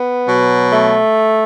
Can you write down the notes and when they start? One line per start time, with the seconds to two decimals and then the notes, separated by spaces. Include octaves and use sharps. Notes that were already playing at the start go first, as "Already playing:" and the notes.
Already playing: B3
0.27 B2 F#3
0.73 A3